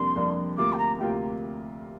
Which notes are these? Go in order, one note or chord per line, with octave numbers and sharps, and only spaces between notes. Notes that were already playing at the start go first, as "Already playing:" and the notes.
Already playing: F2 C3 G3 A#3 D4 C6
F2 C3 G3 A#3 D4
D2 C3 A#3 F4 D6
G5
A#5
D2 C3 A#3 F4 G5